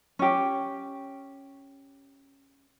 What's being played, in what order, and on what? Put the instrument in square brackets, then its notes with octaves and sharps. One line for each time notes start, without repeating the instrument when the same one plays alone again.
[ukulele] C#4 G4